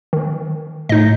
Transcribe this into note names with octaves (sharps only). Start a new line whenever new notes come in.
D#3
A2 D#4 D#5